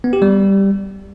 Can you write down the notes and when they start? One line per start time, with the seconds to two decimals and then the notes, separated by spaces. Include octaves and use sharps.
0.04 B3
0.13 G4
0.22 G3